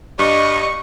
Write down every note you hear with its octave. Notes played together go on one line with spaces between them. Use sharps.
G2 G3 D#5 C#6